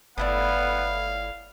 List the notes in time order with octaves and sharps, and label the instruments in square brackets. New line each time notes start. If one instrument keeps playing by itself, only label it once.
[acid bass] G1 [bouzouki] A2 E4 D5 [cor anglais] B3 [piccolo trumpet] F5